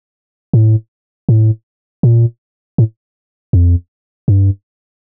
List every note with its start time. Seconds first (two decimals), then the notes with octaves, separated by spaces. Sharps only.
0.53 A2
1.29 A2
2.03 A#2
2.78 A2
3.53 F2
4.28 G2